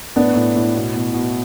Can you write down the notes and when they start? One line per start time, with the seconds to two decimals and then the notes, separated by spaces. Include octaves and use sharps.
0.16 A2 B3 D4
0.35 A2
0.55 A2
0.75 B2
0.94 B2
1.13 B2